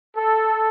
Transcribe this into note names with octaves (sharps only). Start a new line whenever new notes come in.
A4